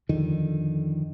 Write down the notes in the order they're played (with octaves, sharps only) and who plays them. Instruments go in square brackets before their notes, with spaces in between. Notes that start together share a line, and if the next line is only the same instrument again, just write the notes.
[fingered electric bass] F2 D3 D#3